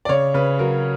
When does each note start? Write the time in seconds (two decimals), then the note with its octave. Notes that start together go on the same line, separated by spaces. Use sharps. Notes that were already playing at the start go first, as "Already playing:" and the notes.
0.05 D5
0.09 C#3 C#5
0.34 C#3 B4
0.59 F#3 A#4